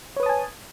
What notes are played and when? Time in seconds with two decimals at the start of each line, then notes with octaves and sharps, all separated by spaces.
0.16 C#5
0.20 B4
0.23 D#6
0.26 A5
0.29 G#5